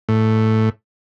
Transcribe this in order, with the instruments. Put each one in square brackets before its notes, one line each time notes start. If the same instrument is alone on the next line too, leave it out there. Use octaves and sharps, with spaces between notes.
[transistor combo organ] A2